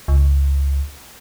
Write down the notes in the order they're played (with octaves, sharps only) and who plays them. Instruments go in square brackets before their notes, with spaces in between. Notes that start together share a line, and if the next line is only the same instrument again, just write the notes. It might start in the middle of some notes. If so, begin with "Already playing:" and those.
[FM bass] C#2